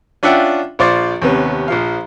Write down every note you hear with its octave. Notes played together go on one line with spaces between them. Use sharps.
C#4 D4 F4 E5 F#5 G5
A#1 F4 C5 D5 C#6
D#2 C3 B3 C#4
A#1 F3 F5